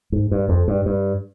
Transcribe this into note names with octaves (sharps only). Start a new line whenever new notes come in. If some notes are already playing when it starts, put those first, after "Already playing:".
G#2
G2
F2
G2
G2